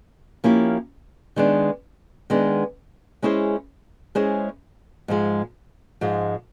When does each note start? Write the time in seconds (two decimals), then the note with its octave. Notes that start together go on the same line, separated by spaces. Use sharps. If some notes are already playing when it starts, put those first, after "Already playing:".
0.44 F3 A#3 C#4 E4 G4
1.36 D#3 G#3 B3 D4
2.30 D#3 G#3 B3 D4
3.22 G#3 C#4 E4 G#4 C5
4.15 G#3 C#4 E4 G#4 C5
5.08 G#2 F3 G#3
6.01 G#2 F3 G#3